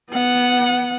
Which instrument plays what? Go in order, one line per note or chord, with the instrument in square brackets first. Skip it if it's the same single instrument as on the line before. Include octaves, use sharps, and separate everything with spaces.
[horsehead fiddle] B3 F#5